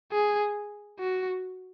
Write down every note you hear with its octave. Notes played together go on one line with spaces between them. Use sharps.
G#4
F#4